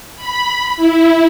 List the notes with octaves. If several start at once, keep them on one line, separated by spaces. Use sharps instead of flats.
B5
E4